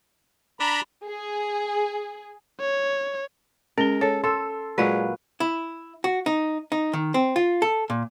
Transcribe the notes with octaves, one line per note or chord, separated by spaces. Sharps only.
D4 A#5 B5
G#4
C#5
G#3 C#4 A#4 G7
A4 C#5
A4 C6 E6
A#2 F#3 G#3 B4 D5 F#5
E4
F#4
D#4
D#4
D#3
C4
F4
A4
A#2